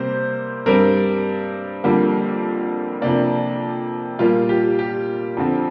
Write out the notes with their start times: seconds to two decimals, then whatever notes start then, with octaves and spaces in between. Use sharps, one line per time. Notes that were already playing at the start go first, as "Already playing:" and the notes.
Already playing: C3 G3 A#3 C5
0.66 G2 G3 C4 A#4
1.84 F2 D3 G3 A#3
3.02 F2 C3 A#3 D4
4.19 A#2 G3 A#3 F4
4.49 G4
4.79 G4
5.37 F2 D3 F3 C4